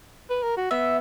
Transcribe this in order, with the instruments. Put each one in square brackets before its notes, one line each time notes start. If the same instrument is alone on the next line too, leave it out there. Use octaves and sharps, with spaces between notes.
[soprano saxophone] B4
A#4
F#4
[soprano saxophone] B3 [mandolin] E5